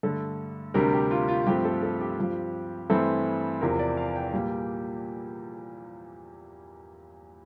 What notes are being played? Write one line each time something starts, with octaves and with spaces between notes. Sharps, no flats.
G2 D3 A3 A4
D2 C3 G3 D4 A#4
G4
F4
F4
G2 F3 A3 C4 G4
A4
A4
G4
G2 F3 C4
G2 E3 A3 C4 E4 A4
E2 C3 F3 A#4
D5
F5
G5
A#2 G3 A#3